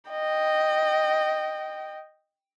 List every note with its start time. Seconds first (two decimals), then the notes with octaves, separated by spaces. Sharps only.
0.10 D#5 G5